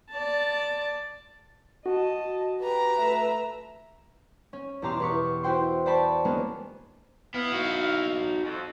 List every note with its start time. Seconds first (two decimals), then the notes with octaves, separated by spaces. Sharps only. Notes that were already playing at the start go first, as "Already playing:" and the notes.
0.12 D5 A5
1.86 F#4 D#5 A5
2.60 G4 B4 A#5
2.98 A3 E5
4.53 C#4
4.82 E2 B2 G4 A#5 C6 D6
5.00 E2 B4 C#6
5.43 E4 F#4 C5 G5 C6
5.86 C5 D5 A5 B5 C#6
6.25 G#3 A#3 B3 C#4 D4
7.34 B3 E4 F5
7.52 D#4 F#4
8.44 F2